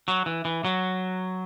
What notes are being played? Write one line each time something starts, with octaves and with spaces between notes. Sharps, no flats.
F#3
E3
E3
F#3